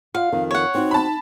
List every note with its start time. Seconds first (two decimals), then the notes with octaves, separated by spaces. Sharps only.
0.14 F4 D5 F5 F#5
0.32 F2 D#3
0.51 C#5 F#5
0.75 C4 D#4 F#4
0.91 A5 B5